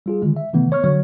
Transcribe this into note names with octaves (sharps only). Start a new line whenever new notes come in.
G3 F4 G#4
D3 D#3 G#3
E5
C3 D#3 E3 A3 B3
C#5 C#6 F6
D3 F#3 C#5